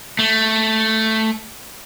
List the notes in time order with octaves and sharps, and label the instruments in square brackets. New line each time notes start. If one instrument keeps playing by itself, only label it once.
[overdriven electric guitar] A3